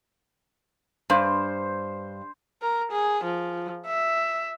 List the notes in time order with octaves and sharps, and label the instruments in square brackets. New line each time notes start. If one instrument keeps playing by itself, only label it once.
[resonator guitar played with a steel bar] G2 [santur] C5
[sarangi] A#4
G#4
F3
E5